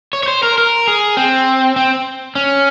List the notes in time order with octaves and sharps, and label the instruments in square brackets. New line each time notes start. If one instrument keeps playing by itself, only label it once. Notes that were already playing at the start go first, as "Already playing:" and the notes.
[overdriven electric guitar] C#5
C#5
C5
A#4
A#4
G#4
C4
C4
C#4